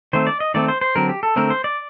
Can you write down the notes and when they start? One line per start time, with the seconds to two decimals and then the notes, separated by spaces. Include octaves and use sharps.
0.13 D#3 A3 C4 C5
0.27 D5
0.40 D#5
0.54 D#3 A3 C4 D5
0.68 C5
0.81 C5
0.95 D3 F#3 C4 A#4
1.09 G4
1.23 A4
1.36 D3 A3 C4 A#4
1.50 C5
1.64 D5